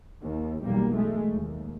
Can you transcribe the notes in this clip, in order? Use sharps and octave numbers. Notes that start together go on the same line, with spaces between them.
D#2
B1 E2 G3 A#3
G#3 A3
D#2